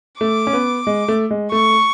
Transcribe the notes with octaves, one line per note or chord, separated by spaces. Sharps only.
A3 D6
C#4
B3
G#3
A3
G#3
A3 C#6